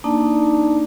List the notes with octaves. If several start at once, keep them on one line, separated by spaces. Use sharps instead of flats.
A#3 D4 D#4 D5 A5